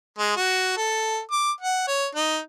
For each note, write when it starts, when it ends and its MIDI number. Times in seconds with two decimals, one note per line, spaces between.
0.19 0.35 56
0.37 0.74 66
0.77 1.19 69
1.32 1.51 86
1.61 1.84 78
1.88 2.07 73
2.15 2.39 63